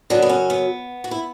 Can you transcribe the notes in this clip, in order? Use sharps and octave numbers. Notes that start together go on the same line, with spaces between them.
F#2 C#3 F#3 B3 D4
B3
C#4
B3
F#4
E4